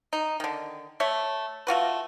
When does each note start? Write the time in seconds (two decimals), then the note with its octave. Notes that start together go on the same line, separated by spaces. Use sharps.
0.13 D#4
0.40 D3 D#3
1.00 A3 C#5 E5
1.67 A3 F4 F#4 B4